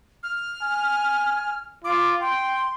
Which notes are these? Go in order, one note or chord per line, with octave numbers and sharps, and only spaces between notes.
F6
G#5
F4 D6
G5 C6